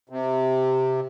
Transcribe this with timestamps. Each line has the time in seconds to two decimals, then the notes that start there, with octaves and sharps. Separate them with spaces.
0.10 C3